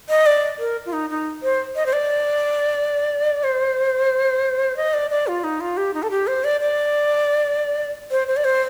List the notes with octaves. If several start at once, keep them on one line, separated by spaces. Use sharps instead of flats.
D#5
D5
A#4
F4
D#4
D#4
C5
D#5
C5
D5
C5
D#5
D5
D5
F4
D#4
F4
G4
D#4
A4
G4
C5
D5
D5
C5
C5
D5
C5